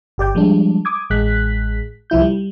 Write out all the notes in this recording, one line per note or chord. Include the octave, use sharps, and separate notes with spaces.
G1 G4 D5 G5
F3 G3 G#3 D4
D6 D#6 G#6
A1 G#3 F#6 B6
C2 F3 E4 G6
G3